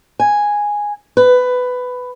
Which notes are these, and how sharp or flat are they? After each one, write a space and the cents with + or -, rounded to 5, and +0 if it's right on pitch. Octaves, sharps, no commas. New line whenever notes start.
G#5 -5
B4 +15